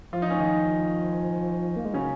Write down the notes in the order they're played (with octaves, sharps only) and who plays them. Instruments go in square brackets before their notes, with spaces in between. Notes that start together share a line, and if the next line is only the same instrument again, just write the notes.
[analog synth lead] F3 [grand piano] F4
[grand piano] D#4
C#4
D#3 D#4
[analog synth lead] A#3
G#3
[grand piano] C#3 C#4 [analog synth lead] F#3